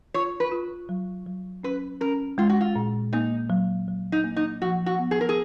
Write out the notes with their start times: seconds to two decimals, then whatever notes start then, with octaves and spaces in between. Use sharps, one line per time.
0.14 F4 C#5
0.40 B4
0.52 F4
0.89 F#3
1.26 F#3
1.63 C#4 B4
2.01 C#4 A#4
2.38 G#3 F4
2.50 F#4
2.61 F4
2.76 A#2
3.13 A#3 D#4
3.50 F#3
3.88 F#3
4.12 D#4
4.24 A#3
4.36 D#4
4.62 F3 F#4
4.86 F#4
4.99 B3
5.11 G#4
5.21 A#4
5.29 G#4